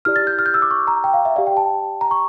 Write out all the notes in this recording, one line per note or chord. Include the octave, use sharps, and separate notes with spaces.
E4 G4 D5 F6
A6
G6
F6
G6
E6
D6
C#6
A#5
G5
F5
E5
G4 D5 F5
G5
A5
A#5
C#6